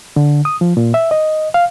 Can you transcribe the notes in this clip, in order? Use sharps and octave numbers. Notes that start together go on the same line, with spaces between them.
D3
D#6
F3
A#2
E5
D#5
F5